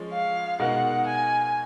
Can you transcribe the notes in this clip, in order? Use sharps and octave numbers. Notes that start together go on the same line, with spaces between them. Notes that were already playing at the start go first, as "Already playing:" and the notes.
Already playing: F3 G#3 C#4
F5
B2 G#3 D#4 F#4 A#4 F#5
G#5